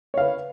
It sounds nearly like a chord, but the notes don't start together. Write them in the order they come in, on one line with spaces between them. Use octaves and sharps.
C#5 F5 B4